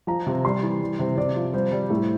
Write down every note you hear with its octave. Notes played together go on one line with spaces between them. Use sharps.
F3 A#5
C3
G3 C6
E3
G3
C3
C3 D5
F3
G3 C5
G3
A2